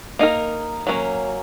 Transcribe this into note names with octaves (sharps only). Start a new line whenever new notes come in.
A#3 D#4 A#4
F#3 A#3 C#4